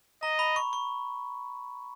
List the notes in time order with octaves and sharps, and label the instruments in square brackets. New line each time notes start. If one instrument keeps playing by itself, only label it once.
[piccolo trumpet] D#5 [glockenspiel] A#5
[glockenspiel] B5
C#6
C#6